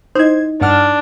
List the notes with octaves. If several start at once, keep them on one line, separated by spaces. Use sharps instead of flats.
D#4 E4 C5 D#5 G#6
G2 D4 F#5 F6